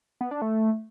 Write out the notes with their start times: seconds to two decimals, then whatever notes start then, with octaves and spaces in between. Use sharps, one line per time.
0.21 B3
0.31 D4
0.42 A3